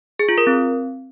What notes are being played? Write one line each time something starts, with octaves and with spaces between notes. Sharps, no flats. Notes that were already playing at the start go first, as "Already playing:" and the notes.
G#4
F4
A#4
C4